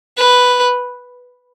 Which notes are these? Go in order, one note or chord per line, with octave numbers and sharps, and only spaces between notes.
B4